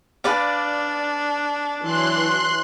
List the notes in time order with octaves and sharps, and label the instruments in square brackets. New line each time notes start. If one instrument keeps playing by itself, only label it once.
[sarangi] D4 [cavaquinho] B4 D5 F5
[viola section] E3 F#3 [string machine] C6 F#6